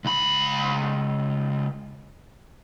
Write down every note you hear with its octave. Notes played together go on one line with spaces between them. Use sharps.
C#2 B5